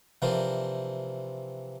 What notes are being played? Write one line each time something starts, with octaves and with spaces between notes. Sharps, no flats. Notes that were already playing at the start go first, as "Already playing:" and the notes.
C3 E3 F3 D4 A#4 C5